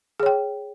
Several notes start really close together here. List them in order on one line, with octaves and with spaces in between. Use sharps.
G#4 C#5 G5